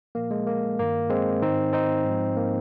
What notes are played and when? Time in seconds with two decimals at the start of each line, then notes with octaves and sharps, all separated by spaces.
0.15 A#2 F3 A#3
0.31 G#3
0.47 A#3
0.79 G2 D#3 A#3
1.10 G#3 C4
1.42 G#2 D#3 C4 D#4
1.73 C4 D#4
2.04 G#2 F3
2.37 A#3